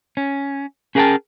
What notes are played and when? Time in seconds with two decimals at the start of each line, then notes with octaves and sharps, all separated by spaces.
0.17 C#4
0.95 C#4 G#4 A#4 F#5 G5 A5